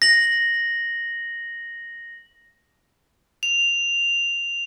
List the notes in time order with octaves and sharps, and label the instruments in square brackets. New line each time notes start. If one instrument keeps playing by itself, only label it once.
[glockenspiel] A#6 F#7
[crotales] F7